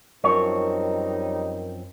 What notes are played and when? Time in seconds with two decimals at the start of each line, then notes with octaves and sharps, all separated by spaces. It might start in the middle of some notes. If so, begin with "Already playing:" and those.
0.24 F#2 F3 G3 C4 D#4 A#4 C#5